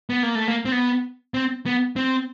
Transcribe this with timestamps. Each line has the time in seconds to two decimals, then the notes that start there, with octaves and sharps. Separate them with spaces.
0.10 B3
0.23 A#3
0.35 A3
0.48 A#3
0.65 C4
0.72 B3
1.34 C4
1.66 B3
1.96 C4